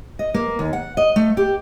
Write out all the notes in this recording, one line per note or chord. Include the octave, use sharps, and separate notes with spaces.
D#5
A#3
D#2
F#5
D#5
A3
G4